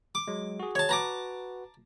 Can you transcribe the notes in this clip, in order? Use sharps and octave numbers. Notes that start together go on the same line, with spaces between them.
D6
F#3 G#3
F#4 G#4
C#5 A5
F#4 B4 A5 A#5 D6